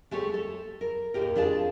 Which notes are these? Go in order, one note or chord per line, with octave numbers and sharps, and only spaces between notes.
G#3 A3 G4 C#5
A4
A#4
D#2 A2 G4 A#4
F2 D4 F4 G#4 A5